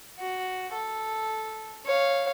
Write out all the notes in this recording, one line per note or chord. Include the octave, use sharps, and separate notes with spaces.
F#4
A4
C#5 F5